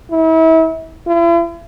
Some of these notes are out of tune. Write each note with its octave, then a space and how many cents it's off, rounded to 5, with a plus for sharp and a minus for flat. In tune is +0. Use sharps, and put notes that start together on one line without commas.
E4 -35
E4 +45